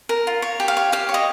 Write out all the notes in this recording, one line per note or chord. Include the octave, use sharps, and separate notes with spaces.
A#4
F4
C#5
G4
F5
C#5
G4 F5
C#5
D#5